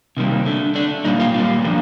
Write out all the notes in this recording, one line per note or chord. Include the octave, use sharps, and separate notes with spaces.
C3 D#3 G3 A#3
D3 A3
D3 A3 D4
A#2 G3 A#3 D#4
F4
A#2 G3 A#3 F4
D3 F3 A#3